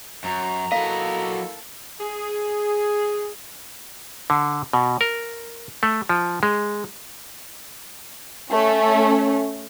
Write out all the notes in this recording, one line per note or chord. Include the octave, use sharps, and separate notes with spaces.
F#2 A#5
F#3 A#3 E4 A4 D#5 F5
G#4
D3
B2
A#4
A3
F3
G#3
A3 C#4